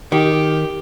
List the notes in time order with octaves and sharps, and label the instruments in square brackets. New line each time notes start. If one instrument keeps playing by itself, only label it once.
[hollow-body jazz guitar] D#3 [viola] G4